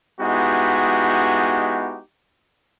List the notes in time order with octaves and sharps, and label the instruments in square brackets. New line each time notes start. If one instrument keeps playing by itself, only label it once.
[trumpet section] G#3 B3 D#4 E4 F#4 G4